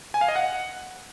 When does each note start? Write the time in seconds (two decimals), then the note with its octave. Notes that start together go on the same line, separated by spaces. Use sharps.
0.14 G#5
0.21 F5
0.28 D#5
0.36 F#5